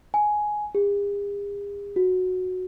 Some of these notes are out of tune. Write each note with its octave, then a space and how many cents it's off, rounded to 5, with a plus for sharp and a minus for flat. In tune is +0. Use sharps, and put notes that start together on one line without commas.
G#5 +10
G#4 -45
F#4 -5